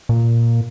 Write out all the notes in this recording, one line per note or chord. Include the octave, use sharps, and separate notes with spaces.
A#2